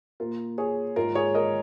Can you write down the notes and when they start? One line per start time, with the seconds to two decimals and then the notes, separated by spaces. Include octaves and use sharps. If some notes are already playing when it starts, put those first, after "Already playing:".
0.20 A#2 A#3 F4 A#4
0.58 G#4 C#5
0.96 G#2 G#3 F4 A#4
1.15 G#4 C#5
1.34 A#4 D#5